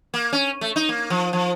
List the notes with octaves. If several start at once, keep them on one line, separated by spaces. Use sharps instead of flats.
A#3
C#4
A3
D#4
A#3
F3
F3